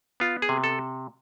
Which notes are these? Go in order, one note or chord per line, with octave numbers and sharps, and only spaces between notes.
B3 F4
G#4
C3
A4